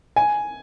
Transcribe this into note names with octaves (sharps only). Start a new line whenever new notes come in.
G#5